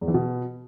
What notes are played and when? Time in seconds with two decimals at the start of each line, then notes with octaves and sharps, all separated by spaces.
0.01 E2
0.08 E3
0.14 B2